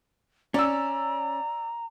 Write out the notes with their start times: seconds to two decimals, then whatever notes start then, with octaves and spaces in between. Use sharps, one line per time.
0.54 C#4 D5 A#5 E6